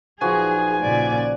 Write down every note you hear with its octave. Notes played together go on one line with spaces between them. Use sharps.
A#1 F3 D#4 F#4 G#4 B4 G#5
A#2 C#3 D5